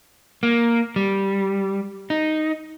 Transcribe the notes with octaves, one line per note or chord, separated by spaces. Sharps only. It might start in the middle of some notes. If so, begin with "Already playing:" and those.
A#3
G3
D#4